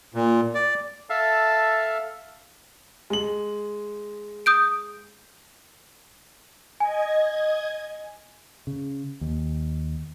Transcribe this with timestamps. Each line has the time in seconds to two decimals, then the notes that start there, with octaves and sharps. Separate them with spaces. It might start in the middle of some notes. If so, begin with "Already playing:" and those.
0.14 A#2
0.55 D5
1.10 A4 E5 F5 A5
3.10 G#3 F#7
4.46 D#6 G6 D7
6.80 D#5 G#5 G#6
8.67 C#3
9.21 D#2